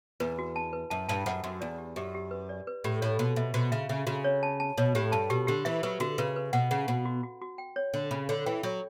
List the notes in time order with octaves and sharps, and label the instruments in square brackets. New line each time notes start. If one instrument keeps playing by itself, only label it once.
[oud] E2 [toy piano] B4
[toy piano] F#4
A5
B4
[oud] F#2 [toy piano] A5
[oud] G2 [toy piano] A5
[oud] F#2 [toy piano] F#5
[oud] F#2 [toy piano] F#4
[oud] E2 [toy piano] D5
[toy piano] G4
[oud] F#2 [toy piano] G4
[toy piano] G4
B4
D5
B4
[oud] A2 [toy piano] G4
[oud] A2 [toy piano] C#5
[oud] B2 [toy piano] F#4
[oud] B2 [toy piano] E5
[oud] B2 [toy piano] F#4
[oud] C#3 [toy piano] E5
[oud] C#3 [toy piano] E5
[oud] C#3 [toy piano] F#4
[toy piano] C#5
A5
A5
[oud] B2 [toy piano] C#5
[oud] A2 [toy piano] G4
[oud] G2 [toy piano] A5
[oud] B2 [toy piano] G4
[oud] D3 [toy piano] G4
[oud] E3 [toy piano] E5
[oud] F#3 [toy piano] B4
[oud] D3 [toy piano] F#4
[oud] C#3 [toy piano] B4
[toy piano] B4
[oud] B2 [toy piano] F#5
[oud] C#3 [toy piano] F#5
[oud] B2 [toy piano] F#5
[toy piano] F#4
F#4
F#4
G5
C#5
[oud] D3 [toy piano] C#5
[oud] C#3 [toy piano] B5
[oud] D3 [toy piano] C#5
[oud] E3 [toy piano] G5
[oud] F#3 [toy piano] C#5